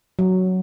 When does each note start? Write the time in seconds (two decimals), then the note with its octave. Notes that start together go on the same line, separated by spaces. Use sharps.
0.19 F#3